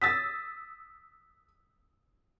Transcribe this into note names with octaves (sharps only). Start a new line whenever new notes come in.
D#6 E6 A6 B6